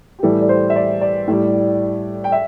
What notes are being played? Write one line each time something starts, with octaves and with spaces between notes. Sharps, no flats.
G4
A2 E3 G3 A4
D5
C5
E5
D5
D5
A2 G3
G5
E5